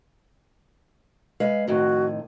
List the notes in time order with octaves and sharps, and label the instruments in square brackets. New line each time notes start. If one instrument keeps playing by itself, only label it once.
[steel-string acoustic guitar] G#3 B4 F5
[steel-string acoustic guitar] F2 A2 D#3 [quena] F#4